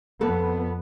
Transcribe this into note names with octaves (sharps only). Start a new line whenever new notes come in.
F2 B3 A4 B4